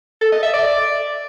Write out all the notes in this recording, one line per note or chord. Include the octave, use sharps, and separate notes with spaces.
A4
D#5
E5
D5